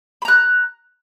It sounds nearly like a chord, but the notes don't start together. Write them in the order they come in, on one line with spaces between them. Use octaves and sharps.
B5 A#5 F#6